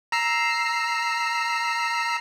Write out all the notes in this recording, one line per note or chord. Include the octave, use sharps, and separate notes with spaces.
A#5 E6 C7